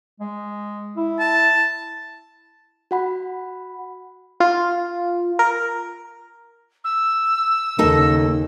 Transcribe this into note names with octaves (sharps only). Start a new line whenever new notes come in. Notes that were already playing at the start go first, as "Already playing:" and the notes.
G#3
E4
A5
F#4 F#5 B5
F4
A#4
E6
D#2 C#3 A#3 D#4 A4